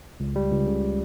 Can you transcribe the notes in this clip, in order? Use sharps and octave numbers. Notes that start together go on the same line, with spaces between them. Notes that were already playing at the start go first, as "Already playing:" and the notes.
C#2
G3
C#2
C#3